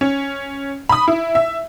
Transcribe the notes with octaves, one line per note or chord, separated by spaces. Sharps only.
C#4
B5 D#6
E4
E5